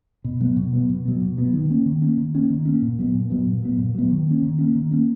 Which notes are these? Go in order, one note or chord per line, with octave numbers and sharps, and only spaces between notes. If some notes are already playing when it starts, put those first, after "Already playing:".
B2
F#3 B3
B2
F#3 B3
B2
F#3 B3
B2
F#3 B3
D#3
A#3 C#4
D#3
A#3 C#4
D#3
A#3 C#4
D#3
A#3 C#4
A#2
F#3 B3
A#2
F#3 B3
A#2
F#3 B3
A#2
F#3 B3
D#3
A#3 C#4
D#3
A#3 C#4
D#3
A#3 C#4